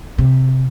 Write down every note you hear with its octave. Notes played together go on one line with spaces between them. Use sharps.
C3